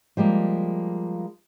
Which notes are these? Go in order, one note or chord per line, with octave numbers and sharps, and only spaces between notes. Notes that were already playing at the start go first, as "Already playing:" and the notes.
F3 G3 G#3 A#3